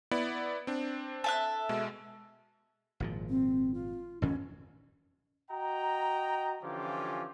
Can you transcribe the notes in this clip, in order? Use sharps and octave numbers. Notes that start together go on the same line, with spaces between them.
B3 E4 D5
C4 D4
A4 E5 F#6
B2 G#3
G#1 A#2 F3
C4
F4
A1 F2 D#3 C#4
F#4 D#5 G5 A#5
D3 E3 F3 C#4 F4 G4